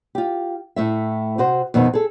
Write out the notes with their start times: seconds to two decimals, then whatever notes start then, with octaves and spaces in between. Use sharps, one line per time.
0.15 F4 G4
0.76 A2 A3 E5
1.38 C3 F#4 C5
1.74 F2 B2 D#3 B3
1.93 G#4 A4